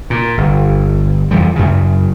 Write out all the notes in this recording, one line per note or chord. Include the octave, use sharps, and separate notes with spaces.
A#2
G1
F2 E3 F3 G3
F#2 C#3